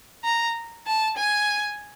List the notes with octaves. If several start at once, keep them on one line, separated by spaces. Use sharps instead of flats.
A#5
A5
G#5